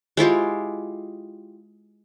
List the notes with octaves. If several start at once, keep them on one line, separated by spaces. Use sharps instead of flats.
G#3 E4 F4 G4